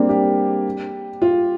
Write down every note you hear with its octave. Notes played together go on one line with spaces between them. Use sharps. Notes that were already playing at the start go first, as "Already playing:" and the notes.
Already playing: G3 A#3 C4 D4
G4
F4